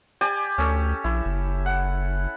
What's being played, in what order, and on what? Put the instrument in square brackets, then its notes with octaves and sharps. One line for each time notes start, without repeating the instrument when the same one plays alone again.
[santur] G4 D5 G#5
[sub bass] D2 [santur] C#4 A4
[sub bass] A#1 [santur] E4
[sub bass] F#1
[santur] F#5